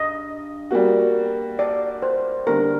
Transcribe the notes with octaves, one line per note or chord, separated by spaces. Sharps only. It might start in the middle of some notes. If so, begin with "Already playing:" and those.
Already playing: G2 D#5
G3 A#3 F#4
D5
C5
D3 G3 A#3 A#4